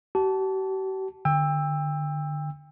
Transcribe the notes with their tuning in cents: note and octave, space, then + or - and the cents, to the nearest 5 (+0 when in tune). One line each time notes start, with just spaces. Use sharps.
G4 -45 A5 -10
D3 +30 G5 +30 E6 +0